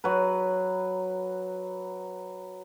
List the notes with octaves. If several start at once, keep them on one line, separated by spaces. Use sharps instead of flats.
F#3 B4